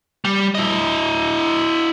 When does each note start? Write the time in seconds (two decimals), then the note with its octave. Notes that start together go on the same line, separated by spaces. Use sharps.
0.25 G3
0.55 E4 D#5